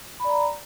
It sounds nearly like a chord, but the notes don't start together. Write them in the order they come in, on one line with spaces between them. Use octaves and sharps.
B5 D5 A#5